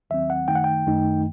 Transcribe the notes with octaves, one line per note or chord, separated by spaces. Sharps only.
D#2 D#3 F#3 C4 E5
F#5
F#2 D#3 A3 D#4 G5
F#5
G5
F#2 D#3 A3 D#4